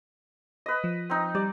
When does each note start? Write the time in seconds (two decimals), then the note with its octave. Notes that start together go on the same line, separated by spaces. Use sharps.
0.66 B4 D#5
0.84 F3
1.10 C4 D#4
1.35 G3 D5